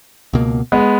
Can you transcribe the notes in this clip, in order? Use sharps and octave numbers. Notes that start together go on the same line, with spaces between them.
C#2 B2 A#3
G#3 B3